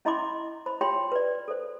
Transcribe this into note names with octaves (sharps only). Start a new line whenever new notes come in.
C#4 E4 D#5 B5 C6 D6
C5 B5
F4 G4 C#5 G5 B5 C6
B4 D5
A4 C5